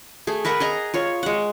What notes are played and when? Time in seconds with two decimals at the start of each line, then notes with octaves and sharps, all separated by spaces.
0.27 A3 G#4
0.45 A#4 B4 E5 F#5
0.60 G#4 D#5 A#5
0.94 F4 C#5
1.23 G#3 F#5